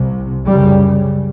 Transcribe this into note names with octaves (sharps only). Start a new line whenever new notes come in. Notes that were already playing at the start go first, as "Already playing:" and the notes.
Already playing: C2 C3
F#2 C#3 G3